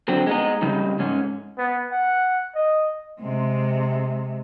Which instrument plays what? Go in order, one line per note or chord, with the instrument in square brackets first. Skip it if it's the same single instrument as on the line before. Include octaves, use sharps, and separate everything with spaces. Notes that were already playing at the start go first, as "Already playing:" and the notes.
[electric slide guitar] D3 F#3 C4
G#3 B3 D#4
F2 C#3 G3 D#4
G#2 C#4
[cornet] B3
F#5
D#5
[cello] C3 G#3